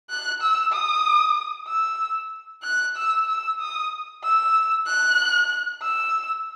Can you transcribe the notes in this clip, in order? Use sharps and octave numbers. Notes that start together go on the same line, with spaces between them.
F#6
E6
D#6
E6
F#6
E6
E6
D#6
E6
F#6
E6